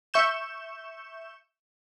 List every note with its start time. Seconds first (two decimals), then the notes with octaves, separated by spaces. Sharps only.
0.14 E5 C#6 G6 E7